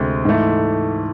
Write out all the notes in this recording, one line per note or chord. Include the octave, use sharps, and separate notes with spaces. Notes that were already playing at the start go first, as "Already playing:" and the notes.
Already playing: D2 C3 G#3 C4
G#2 E3 A3 E4